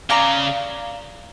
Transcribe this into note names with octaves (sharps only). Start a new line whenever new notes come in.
C#3 D5 F5 A#5